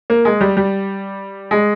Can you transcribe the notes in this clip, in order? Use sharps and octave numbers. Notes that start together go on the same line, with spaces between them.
A#3
G#3
G3
G3
G#3